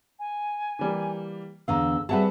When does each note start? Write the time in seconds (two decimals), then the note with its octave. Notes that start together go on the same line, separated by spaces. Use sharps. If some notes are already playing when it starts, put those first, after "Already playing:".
0.19 G#5
0.79 E3 G3 A#3
1.68 E2 D3 F5 A#5 E6
2.09 G3 C4 G#4 B4 E5 F#5 A5